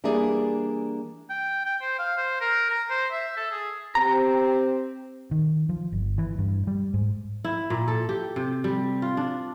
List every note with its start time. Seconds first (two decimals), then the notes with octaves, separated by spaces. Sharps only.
0.04 E3 G3 A#3 D4 G#4 D5
1.30 G5
1.65 G5
1.82 C5
1.99 F5
2.17 C5
2.41 A#4
2.70 A#5
2.90 C5
3.11 E5
3.37 A4
3.52 G#4
3.95 C4 G4 A#5
5.31 D#3
5.69 F3
5.92 G1
6.18 E3
6.38 G2
6.67 G3
6.94 G#2
7.45 E4
7.70 A#2
7.88 A4
8.09 G4
8.36 C3
8.64 G3
9.02 F4
9.17 D4